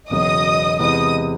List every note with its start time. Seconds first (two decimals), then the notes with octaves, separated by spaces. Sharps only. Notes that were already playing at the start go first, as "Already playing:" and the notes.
0.10 E1 E2 C#3 F#3 D#5 D#6
0.79 E2 C3 E3 G#3 B3 D#5 D#6